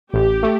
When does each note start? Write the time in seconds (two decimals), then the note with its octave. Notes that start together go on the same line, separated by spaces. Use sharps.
0.13 A1 G4
0.43 A3